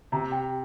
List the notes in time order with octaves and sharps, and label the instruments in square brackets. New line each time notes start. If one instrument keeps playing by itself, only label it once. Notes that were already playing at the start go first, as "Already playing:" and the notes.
[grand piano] C3 [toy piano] A#5
[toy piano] G5